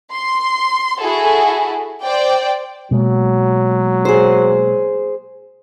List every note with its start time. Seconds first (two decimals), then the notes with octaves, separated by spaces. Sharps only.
0.11 C6
0.99 E4 F#4 G#4 A4
2.03 C5 D5 G5
2.91 B2 F#3 G#3 A#3
4.05 G#4 C5